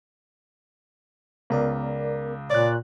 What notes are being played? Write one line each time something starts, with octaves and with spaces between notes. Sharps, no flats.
C#2 B3 A#4 D5
A#2 C#5 D5 F#6